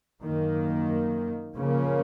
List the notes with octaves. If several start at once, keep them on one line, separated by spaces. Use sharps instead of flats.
F#2 D#3 A#3
C#3 F3 A#3 C#4